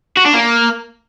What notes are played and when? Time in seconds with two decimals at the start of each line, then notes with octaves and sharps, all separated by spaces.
0.17 F#4
0.25 D4
0.34 A#3